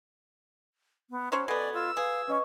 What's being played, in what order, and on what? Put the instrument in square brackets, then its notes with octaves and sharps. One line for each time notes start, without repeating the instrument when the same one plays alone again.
[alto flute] B3
[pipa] F#3 C5 C#5 [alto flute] C#4
[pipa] B2 B3 [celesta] A4 G#6 [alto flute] D5 [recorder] G#5
[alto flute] F4 [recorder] E6
[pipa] G#4 [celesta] B4 [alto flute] F5
[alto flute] C#4 [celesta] B4 D#5 C#6